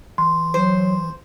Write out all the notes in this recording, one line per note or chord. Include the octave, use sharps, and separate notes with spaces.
E3 C6
F#3 C5